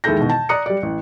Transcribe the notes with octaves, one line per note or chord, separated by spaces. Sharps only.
D#2 G#3 E4 A4 G6 A#6
B2 D#3 E3
A5
D5 A#5 D#6 F#6 C#7
G3 D5
A1